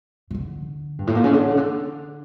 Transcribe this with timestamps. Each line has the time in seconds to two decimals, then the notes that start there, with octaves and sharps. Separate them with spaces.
0.31 C#3
0.35 D3
0.99 G2
1.07 A2
1.15 A#2
1.24 C#3
1.33 D3
1.51 C#3
1.57 D3